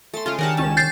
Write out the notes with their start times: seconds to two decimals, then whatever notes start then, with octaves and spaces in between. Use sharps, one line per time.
0.14 A3 C6 A6
0.26 C#3 G#3 F4 G#4
0.39 D#3 C#4 D4 G4 A#4 F#5 A5
0.57 C#2 C#4 A5 E7
0.77 G6 A6 C7